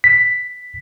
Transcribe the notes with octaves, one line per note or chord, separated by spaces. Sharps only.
B6